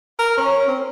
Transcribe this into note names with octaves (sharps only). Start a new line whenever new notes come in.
A#4
C#4
C4